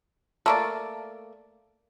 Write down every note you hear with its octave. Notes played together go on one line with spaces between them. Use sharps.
A3 A#3 D5